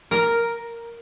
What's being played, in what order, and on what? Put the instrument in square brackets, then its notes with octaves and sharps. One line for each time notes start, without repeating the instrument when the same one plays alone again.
[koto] A#4